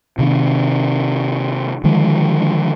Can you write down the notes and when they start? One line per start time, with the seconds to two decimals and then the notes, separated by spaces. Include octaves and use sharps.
0.19 C3 D#3
1.84 D3 D#3 F3 G#3